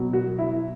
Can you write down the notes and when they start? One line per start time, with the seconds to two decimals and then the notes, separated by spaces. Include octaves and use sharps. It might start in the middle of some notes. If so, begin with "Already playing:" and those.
Already playing: B2 F#3
0.13 F#4
0.39 E4